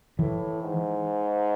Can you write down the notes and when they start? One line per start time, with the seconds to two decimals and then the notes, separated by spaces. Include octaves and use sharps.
0.19 A2 E3
0.63 G#2